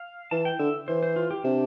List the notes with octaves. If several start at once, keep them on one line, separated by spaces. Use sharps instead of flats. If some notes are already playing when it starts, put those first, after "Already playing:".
Already playing: F5
E3 A5
G5
D3 E5
E3 C5
C5
F4
G4
C3 D4